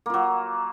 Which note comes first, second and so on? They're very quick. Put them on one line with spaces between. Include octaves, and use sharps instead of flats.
A#3 F4 F#3